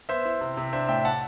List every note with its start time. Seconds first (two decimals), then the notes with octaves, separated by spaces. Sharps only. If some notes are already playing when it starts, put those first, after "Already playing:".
0.09 B3 C5 E5
0.25 E4
0.41 C3
0.57 C3
0.73 D4 C5 E5
0.88 A2 E5 G5
1.05 F#5 A5